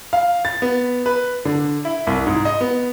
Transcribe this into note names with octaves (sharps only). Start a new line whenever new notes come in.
F5
A6
B3
B4
D3
E4
C2
G#2
D#5
B3